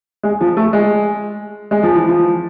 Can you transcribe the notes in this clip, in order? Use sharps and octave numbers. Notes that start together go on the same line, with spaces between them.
G#3
F3
A3
G#3
G#3
F3
E3
F3